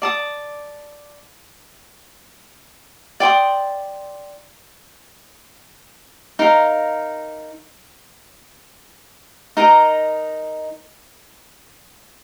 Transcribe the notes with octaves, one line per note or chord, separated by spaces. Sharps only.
D5 A5 D#6
D5 G5 C6 D#6
D#4 A#4 F5
D#4 A#4 D#5